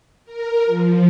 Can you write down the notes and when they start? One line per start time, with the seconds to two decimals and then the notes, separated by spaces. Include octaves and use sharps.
0.25 A#4
0.65 F3